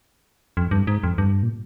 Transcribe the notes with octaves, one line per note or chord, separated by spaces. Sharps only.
F2
G2
G#2
F2
G2
A#2